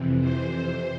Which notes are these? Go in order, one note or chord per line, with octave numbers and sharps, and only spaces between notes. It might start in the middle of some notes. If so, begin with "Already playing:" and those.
Already playing: F2 C3 E3
C5